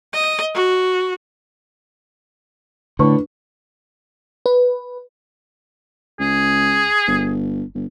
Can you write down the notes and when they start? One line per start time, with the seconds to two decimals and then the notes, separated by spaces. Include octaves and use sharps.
0.13 D#5
0.54 F#4
2.99 A2 D3 D4 B4 C#6
4.46 B4
6.20 C#2 G#4
7.08 G1
7.75 G1